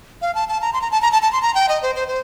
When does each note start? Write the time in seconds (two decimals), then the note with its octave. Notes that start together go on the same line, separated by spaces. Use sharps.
0.22 F5
0.35 A5
0.49 A5
0.61 A#5
0.73 C6
0.82 A#5
0.91 A5
1.02 A#5
1.12 A5
1.22 A5
1.32 C6
1.42 A#5
1.55 G5
1.69 D#5
1.82 C5
1.95 C5
2.08 C5